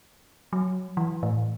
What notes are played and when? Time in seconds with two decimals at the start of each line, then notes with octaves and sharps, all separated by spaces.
0.53 F#3
0.97 E3
1.23 A2